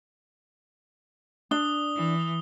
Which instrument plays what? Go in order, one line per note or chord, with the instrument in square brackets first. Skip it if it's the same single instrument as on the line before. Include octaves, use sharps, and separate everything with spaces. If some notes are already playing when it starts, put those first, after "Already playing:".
[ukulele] D4 [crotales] D#6 G7
[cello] E3